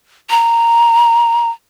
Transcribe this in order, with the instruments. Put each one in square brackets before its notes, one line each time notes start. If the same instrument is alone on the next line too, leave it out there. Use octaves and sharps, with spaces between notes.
[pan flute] A#5